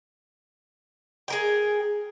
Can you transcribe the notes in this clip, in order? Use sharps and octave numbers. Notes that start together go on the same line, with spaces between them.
G#4 A#4 G5